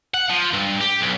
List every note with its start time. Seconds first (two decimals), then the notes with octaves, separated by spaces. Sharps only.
0.14 F#5
0.30 F3
0.54 G2
0.81 G4
1.01 B1